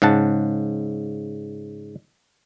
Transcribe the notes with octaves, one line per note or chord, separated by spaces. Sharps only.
G#2 C#3 F#5 A5